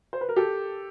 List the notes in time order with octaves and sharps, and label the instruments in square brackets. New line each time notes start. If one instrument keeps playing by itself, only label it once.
[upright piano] C5
B4
A#4
G4 A4